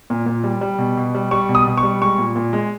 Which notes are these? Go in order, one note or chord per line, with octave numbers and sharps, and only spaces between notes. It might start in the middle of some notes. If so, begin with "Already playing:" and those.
A#2
A#2
G3
G3
B2
B2
G3
G3 C#6
B2
D#6
B2
C#6
G3
G#3 C#6
A#2
A#2
G#3